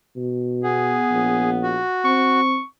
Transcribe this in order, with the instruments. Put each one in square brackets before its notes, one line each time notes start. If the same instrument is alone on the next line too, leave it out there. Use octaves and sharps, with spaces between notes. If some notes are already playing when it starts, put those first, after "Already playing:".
[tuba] B2
[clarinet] B3 [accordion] G#4
[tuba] A#1
[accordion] F#4
[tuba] C4 [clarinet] C#6